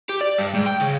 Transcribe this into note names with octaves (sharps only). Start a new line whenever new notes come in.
G4
D5
G2
G#2
G5
C#3